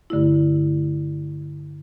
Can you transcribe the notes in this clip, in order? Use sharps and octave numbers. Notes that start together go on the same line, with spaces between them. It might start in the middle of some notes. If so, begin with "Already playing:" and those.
G2 D3 A3 E4